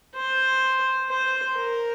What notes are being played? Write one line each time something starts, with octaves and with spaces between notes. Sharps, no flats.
C5
C5
A#4